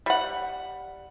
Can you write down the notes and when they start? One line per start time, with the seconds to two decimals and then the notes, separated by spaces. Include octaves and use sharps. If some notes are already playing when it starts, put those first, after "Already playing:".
0.06 G3 F#5